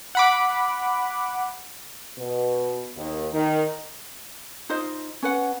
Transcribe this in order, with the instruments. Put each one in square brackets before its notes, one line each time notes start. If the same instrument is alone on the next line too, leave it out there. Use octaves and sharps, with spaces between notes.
[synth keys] F#5 B5 D6
[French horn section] B2
D#2
D#3
[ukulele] D#4 F4 C5 D#5
C#4 B4 F#5